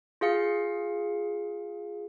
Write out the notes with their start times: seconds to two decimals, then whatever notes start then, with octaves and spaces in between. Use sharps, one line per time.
0.21 F4 G#4 F5 C#7